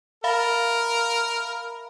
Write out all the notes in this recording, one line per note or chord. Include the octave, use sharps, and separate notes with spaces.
A#4 E5 F5 B5